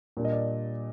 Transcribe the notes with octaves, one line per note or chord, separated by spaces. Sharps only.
A#2 G3 A#3 D4 A#4
D#5
D5